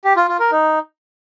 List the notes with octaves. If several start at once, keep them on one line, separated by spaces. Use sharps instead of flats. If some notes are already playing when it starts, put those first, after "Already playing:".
G4
F4
F4
A#4
D#4